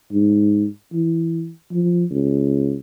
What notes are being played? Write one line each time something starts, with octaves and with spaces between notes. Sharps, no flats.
G#2
E3
F3
C#2